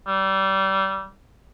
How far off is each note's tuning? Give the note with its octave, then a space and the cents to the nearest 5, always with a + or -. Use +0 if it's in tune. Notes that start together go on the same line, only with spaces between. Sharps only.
G3 -25